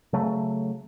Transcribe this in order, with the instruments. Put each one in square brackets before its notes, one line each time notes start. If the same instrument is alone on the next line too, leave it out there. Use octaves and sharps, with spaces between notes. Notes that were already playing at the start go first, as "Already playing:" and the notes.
[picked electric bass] C#3 F#3 A3